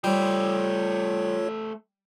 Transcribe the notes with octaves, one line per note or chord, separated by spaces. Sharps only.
G3 A3 F4 C5 C#5